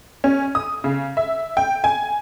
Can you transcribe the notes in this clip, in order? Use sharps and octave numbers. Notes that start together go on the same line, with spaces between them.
C#4
D#6
C#3
E5
G5
G#5